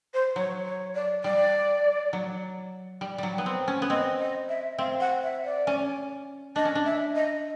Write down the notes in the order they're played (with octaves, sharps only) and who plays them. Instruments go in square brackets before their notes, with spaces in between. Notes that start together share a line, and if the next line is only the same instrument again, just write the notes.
[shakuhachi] C5
[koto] F#3 [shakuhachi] C#5
[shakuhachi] C#5
D5
[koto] G3 [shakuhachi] D5
[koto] F#3
G3
F#3 G3
B3
C4
C#4
B3
[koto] C4 [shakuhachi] D#5
[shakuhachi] D#5
E5
[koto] C4 [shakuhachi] F5
[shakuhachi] F#5
E5
D5
[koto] C#4
[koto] D4 [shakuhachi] D#5
[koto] C#4
D4
[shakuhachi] E5
D#5